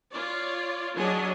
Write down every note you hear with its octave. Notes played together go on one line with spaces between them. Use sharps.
F4 C#5 D5
F#3 D4 G#4 C#5 D#5